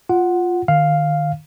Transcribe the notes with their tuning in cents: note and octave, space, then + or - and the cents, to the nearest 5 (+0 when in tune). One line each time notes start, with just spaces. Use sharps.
F4 +5 F#5 +0
D#3 -35 F5 +0